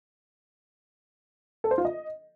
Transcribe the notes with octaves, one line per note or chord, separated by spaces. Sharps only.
A4
C5
F4
D#5